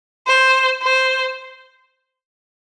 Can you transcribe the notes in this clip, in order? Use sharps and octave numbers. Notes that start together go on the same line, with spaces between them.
C5
C5